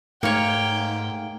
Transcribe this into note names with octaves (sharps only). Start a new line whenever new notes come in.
G#2 A3 A#3 D#4 C#5 F5 G5